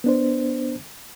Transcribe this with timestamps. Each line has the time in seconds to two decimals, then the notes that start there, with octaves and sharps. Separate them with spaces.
0.04 B3 D4 C5